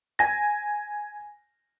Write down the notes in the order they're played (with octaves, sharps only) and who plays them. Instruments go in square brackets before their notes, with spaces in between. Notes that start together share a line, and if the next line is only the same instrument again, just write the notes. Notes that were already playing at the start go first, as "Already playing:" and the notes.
[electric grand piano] G#5 A#6